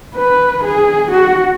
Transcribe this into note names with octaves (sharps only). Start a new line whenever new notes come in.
B4
G#4
F#4